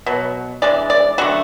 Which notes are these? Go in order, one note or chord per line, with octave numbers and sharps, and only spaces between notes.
B2 F#3
E3 G#3 D4 D5
D5
D3 F#3 A3 F#4